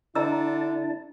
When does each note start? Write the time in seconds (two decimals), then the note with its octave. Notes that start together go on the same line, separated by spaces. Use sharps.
0.15 D3 D4 E4 D#5 A5 A#5 E6